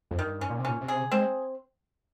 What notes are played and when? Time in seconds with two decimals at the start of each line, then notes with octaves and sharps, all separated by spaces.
0.11 F2
0.19 G2 D#3
0.41 C#4
0.49 A#2
0.59 C3
0.65 A#2 C#4
0.81 C3
0.88 G#4
1.11 G#3 C4